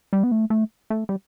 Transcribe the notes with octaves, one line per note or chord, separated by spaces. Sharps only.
G3
B3
A3
A3
A3
G3